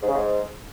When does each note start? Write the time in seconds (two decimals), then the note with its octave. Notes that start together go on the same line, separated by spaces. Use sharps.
0.02 G#2
0.08 C#3
0.13 G#2